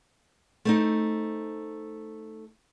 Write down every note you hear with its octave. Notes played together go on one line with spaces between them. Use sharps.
A3 C4 D#4